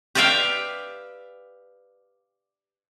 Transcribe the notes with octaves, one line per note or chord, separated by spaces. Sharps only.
G4 B4 D5 E5 F5 G5